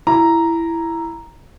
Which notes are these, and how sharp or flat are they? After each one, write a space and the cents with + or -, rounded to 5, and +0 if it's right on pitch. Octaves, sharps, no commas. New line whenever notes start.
E4 +10 A#5 +0